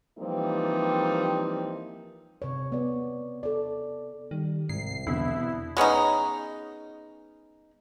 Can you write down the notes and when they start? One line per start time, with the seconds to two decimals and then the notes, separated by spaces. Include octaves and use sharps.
0.19 E3 F3 G3 A#3 C4 D#4
2.42 C3 C#5
2.72 B3 D5
3.43 A4 D5
4.31 D#3 G3
4.69 C2 G#2 C7
5.07 E2 B2 D3 E4
5.77 G#3 B3 C#4 D#4